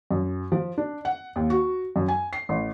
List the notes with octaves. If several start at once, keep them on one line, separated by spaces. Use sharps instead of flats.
F#2
F3
D4
F#5
D#2
F#4
F#2
G#5
C7
A1